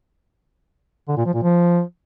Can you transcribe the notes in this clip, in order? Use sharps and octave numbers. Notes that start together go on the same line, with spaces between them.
D3
A#2
F3
A#2
F3